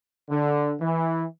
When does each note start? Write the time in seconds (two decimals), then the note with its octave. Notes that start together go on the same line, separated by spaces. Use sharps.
0.29 D3
0.79 E3